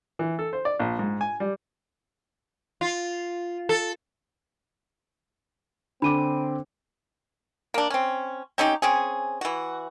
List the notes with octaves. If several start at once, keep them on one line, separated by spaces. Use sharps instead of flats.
E3
A4
C5
D5
A#1
G#2
G#5
G3
F4
A4
D3 C4 D4 B5 D6 D#7
A#3 D4
C4 C#4
C4 C#4 D#4 G4
C4 C#4 G#4
E3 F#4